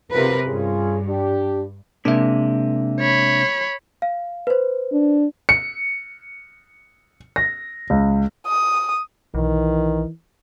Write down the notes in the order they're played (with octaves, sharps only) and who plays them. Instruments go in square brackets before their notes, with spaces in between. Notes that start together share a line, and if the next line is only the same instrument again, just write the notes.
[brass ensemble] B1 F3 [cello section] C3 A#4 B4
[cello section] G2 [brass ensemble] C#4 F4 G#4
[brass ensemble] D4 G4
[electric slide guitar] C3 G#3 A#3 [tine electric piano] D4 E5
[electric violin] C#5 B5
[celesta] F5
B4 C5
[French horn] D4
[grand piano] C#7
A#6
C#2
[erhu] D#6
[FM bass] B1 [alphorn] D#3 [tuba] E3